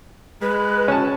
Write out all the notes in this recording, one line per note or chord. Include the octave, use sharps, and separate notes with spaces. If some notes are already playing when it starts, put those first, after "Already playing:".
G#3 B4
C#4 A5